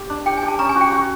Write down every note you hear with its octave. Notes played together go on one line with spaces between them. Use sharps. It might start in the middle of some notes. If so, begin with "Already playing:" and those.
Already playing: G4
D4
G4 G5
G#5
G4
A5
C#4 A#5
G#5
F#4
G5
F#4